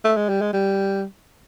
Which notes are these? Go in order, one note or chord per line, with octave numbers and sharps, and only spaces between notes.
A3
G#3
G3
G#3
G3